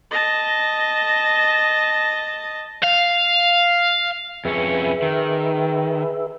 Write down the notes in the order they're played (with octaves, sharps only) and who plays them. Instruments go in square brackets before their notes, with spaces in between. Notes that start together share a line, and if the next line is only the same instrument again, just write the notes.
[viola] D#5 A5
[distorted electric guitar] F5
[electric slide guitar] F2 C#4 [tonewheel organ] G#4 B4 E5
[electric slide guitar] D#3